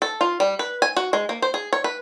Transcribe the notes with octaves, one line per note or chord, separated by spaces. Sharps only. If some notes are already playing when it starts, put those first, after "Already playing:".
A4
F4
G3
B4
G#5
F#4
G#3
A#3
C5
G#4
C#5
B4